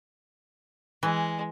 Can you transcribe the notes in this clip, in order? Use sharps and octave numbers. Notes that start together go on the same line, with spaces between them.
E3 G#3